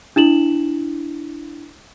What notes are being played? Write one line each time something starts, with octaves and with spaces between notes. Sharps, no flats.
D4 E4 E7 F#7